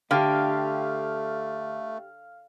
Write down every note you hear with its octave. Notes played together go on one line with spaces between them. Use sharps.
D3 A3 G4 F5